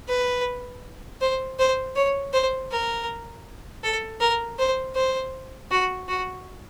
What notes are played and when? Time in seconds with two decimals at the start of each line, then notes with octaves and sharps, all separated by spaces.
0.09 B4
1.21 C5
1.59 C5
1.96 C#5
2.33 C5
2.71 A#4
3.83 A4
4.20 A#4
4.59 C5
4.95 C5
5.71 F#4
6.08 F#4